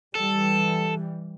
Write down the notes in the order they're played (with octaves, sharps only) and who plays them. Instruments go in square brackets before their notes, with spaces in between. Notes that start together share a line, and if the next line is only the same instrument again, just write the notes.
[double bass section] E3 G3 [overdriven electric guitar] A4